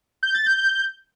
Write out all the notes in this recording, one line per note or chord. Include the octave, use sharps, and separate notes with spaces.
G6
A6
G6